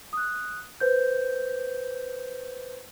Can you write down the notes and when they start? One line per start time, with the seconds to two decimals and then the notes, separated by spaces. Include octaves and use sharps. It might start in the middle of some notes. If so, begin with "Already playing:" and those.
0.13 D#6 F#6
0.80 B4 C5 G6